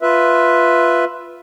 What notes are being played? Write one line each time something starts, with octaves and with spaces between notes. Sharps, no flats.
F4 B4 E5